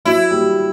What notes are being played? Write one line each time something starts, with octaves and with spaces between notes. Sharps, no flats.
F#3 E4
G3